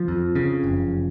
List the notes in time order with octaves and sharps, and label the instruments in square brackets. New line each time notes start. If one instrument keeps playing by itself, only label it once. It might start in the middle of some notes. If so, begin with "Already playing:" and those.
Already playing: [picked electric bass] F3
F2
C#3
F#1